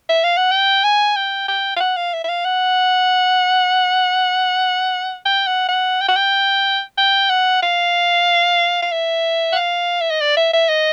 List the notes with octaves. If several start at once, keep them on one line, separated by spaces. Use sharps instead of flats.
E5
F5
F#5
G5
G#5
G5
G5
F5
F#5
F5
E5
E5
F5
F#5
G5
F#5
F#5
G5
F#5
G5
G5
F#5
F5
F5
E5
F#5
F5
E5
D#5
D5
E5
E5
D#5